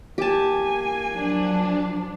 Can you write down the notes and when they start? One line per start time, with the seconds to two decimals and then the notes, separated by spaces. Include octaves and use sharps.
0.18 A#3 G4 G#5 A5
1.12 F3 F#3 D4